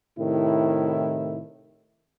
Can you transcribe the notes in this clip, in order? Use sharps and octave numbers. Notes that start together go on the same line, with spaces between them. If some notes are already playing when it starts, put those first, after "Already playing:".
A2 C3 D#3 E4